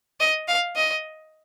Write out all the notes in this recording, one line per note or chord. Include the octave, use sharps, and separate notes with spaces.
D#5
F5
D#5